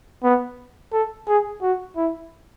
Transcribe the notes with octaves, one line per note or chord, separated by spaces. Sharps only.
B3
A4
G#4
F#4
E4